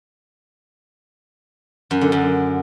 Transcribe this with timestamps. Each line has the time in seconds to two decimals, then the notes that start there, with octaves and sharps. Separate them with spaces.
1.91 F#2
2.01 D3
2.12 F#2